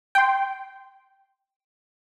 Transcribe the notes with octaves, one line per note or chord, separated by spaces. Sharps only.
G5 C6